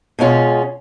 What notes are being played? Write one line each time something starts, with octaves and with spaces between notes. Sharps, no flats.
B2 G#3 C#4 F4